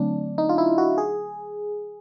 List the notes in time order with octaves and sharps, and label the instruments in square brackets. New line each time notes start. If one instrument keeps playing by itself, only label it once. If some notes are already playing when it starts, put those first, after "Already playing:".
Already playing: [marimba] D3 F#3 A3 C4 [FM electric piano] D4
[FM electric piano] D#4
F4
E4
F#4
G#4